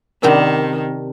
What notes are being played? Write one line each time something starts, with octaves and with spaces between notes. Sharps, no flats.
C3 D#3 C#4 D4 A#4 B5